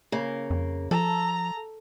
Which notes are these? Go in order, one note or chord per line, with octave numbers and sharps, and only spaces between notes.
C#3 A#3
F2
F3 A4 A#5